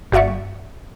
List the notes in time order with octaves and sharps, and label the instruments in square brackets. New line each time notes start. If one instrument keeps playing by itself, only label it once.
[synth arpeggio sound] G1 F#4 D5 E5 C#6